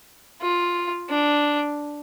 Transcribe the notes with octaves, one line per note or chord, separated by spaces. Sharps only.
F4
D4